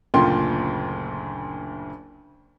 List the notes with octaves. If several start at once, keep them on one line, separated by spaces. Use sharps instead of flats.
F#1 D2 A#2 F4 G5 C6